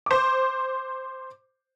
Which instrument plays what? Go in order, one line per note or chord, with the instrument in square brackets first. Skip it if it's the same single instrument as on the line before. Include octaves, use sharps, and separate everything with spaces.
[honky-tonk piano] C5 D6